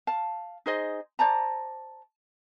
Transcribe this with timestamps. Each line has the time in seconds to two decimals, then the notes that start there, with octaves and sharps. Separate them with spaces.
0.07 F5 A5
0.66 D#4 G#4 C5 D#5
1.19 C5 D5 A5 A#5